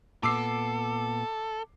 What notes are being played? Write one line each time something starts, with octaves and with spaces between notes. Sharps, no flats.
A#2 B3 A4 D6 E6 C7